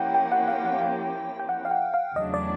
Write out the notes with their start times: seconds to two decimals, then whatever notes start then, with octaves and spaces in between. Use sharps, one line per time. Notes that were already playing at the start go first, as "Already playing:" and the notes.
Already playing: F3 A#3 C#4 E4 G4 F#5 G5
0.14 G5
0.32 F#5
0.48 F5
0.65 F#5
0.81 G5
1.39 G5
1.49 F#5
1.65 F5
1.71 F#5
1.94 F5
2.16 E2 C#3 F#3 A3 D4 D#5
2.34 D5